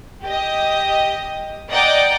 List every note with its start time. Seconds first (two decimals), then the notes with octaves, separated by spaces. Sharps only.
0.23 G4 D#5
1.70 D5 D#5 F#5 G5 A#5 D6